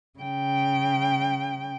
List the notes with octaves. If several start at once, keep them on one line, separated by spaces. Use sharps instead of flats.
C#3 G5